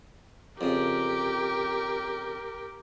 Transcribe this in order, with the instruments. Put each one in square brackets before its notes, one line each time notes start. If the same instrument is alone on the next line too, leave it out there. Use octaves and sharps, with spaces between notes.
[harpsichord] F2 C#3 [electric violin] G4 A#4